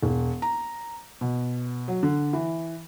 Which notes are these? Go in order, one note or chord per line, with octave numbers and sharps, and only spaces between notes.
E1
A#5
B2
F#3
D3
E3